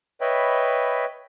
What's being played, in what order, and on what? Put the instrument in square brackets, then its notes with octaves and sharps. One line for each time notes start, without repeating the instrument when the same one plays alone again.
[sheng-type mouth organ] B4 C#5 D#5 E5 G5 B5